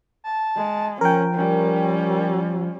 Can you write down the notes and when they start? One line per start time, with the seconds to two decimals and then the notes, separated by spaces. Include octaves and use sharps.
0.24 A5
0.56 G#3
1.01 F3 C#4 A#4 G5
1.34 G3 C#4